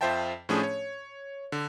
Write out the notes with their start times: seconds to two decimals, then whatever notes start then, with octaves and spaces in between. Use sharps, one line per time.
0.01 F2 F4 C5 E5 G5 A5
0.49 A2 F3 A3 C#4 D4 G#4
0.63 C#5
1.52 D3